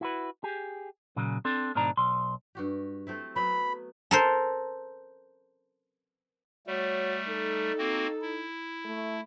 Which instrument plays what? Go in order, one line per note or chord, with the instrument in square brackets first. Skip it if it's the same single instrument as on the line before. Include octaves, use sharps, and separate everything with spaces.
[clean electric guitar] E4 F#4 B4
G4 G#4
A#2 C#3 F#3
C4 D4 A4
G#2 B2 D#3 D4 A#5
B1 C6
[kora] G2 F#4 G4
A3 C4 E4
[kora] F#3 B3 [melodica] B5
[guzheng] A4 A#4 C5
[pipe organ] G3 A3 [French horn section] F#4 C#5
[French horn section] D#4 A4
[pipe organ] A#3 C4 F#4
E4
[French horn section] A3